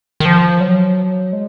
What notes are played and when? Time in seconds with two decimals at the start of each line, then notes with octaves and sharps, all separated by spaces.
0.20 D#3
0.25 F3
0.60 F#3
1.33 G#3